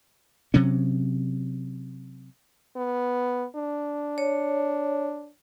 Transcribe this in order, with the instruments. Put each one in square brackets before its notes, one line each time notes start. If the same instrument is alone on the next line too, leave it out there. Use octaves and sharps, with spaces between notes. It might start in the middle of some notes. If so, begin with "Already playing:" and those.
[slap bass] C3 F#3 C#4
[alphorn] B3
D4
[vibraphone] C#5